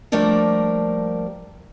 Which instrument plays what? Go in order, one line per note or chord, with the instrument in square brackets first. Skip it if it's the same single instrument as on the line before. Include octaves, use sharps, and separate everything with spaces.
[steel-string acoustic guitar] F3 G3 A3 A#3 D4 A#4